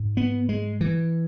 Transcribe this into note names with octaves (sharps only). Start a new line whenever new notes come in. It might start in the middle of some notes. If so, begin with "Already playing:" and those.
Already playing: G#2
B3
G#3
E3